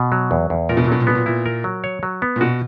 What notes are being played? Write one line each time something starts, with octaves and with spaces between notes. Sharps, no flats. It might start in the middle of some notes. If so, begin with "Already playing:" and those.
Already playing: B2
F#3
E2
E2
A#2 A#4
B2
A#2
B2 F#3
A#2
B2 B3
A#2
A#2 E4
A#4
F#3
C#5
F#3
B3
A#2
B2 F#4